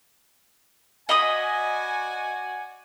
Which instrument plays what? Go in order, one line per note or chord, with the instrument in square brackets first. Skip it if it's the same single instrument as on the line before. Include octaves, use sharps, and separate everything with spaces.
[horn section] F#4 D5 G#5 [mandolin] D#5 B5 D#6